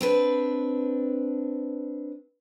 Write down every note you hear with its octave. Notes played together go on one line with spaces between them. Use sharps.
C4 D4 B4